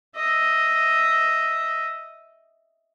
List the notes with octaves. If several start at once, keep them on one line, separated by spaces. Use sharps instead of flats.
D#5 E5